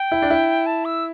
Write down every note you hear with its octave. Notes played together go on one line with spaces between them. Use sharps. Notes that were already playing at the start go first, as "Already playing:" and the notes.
Already playing: G5
E4
D4
E4
A5
E6